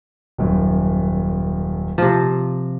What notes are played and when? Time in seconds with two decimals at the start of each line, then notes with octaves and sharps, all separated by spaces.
0.38 D#1 F#2
1.98 C3 F3